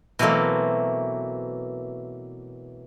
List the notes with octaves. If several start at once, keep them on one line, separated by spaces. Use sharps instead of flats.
B2 E3 F#3 A3 A#3 C4